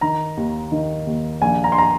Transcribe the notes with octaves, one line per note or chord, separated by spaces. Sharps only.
D#3 A#5
D#2
D#3
D#2
A#1 G#5
A#5
C6
A#5